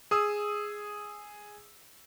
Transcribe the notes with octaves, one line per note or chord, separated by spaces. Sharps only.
G#4 D#6 E6